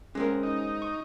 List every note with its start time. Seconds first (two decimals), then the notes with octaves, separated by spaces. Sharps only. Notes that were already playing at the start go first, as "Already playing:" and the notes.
0.15 G#3 C4 C#4 A#4
0.43 D#4
0.82 C#6